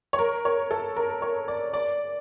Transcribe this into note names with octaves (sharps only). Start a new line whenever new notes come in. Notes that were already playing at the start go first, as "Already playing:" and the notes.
C#5
A#4
C#5
A4
A#4
C#5
D5
D5